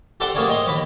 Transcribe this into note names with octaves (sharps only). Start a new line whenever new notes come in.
G4 A4 C5 D5 F#5 G5
G3 A3 A#3 G#4 C#5 D5
C5 C#5 D#5 G5
D#2 B3 B5 D6